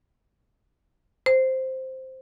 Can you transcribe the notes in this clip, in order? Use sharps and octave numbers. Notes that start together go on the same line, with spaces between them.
C5